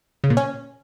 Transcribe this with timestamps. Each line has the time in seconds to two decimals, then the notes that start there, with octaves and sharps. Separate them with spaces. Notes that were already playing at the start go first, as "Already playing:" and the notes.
0.24 C#3
0.30 A#2
0.37 C#4